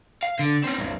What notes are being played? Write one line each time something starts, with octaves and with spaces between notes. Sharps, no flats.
F5
D3
C4 C#4
B1 F#2